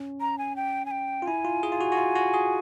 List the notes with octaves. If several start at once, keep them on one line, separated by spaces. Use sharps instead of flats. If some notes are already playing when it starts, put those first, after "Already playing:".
Already playing: C#4
A#5
G#5
G5
G#5
G5
F4
E4 G#5
F4
G#4
F4
F#4
F#4
F4
F#4
G#4